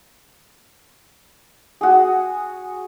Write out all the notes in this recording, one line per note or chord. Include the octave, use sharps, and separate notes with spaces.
F#4 G#4